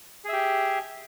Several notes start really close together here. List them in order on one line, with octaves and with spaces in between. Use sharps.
G#4 E5 G4